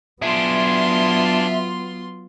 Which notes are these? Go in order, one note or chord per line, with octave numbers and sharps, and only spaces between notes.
F#3 B3 D4 F4 G#4 E5 C6